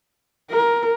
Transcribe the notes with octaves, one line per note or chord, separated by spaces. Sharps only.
A#4